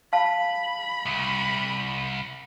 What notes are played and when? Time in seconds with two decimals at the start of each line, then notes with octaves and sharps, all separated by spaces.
0.13 F5 A5 B5
1.06 C2